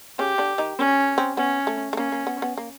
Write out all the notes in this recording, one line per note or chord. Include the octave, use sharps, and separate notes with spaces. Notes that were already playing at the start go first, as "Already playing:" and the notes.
C#3 C#4 G4
D3 D4
D#3 D#4
C#4
C4
B3 C#4
A3
A3
A#3 C#4
A#3
B3
B3
A#3